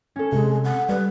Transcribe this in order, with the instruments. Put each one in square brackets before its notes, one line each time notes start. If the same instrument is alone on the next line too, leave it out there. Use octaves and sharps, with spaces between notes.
[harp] C#4 A4
[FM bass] C3 [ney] G#3
[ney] F#5
[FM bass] G3 [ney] B4